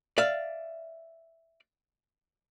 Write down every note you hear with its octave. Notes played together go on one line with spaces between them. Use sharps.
D5 E5 F5